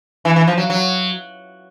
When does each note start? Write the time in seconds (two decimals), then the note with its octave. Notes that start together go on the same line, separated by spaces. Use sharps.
0.25 E3
0.36 E3
0.47 F3
0.58 F#3
0.70 F#3